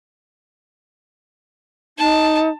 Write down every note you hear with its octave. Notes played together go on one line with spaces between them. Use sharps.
D#4 A5